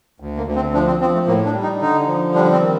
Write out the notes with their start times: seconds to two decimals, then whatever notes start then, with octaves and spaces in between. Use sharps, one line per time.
0.20 D2
0.37 A#3
0.46 D2
0.56 C4
0.73 F3 D4
0.87 C4
1.01 F3 C4
1.14 A3
1.27 A2 A#3
1.45 D4
1.53 G3
1.63 D#4
1.81 D3 D#4
2.07 F3
2.34 G3 D4
2.52 C4
2.61 D#3